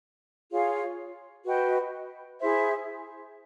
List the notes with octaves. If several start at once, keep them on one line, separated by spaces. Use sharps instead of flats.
F4 G#4 C#5 F5
F#4 B4 D#5 G5
E4 G#4 C5 E5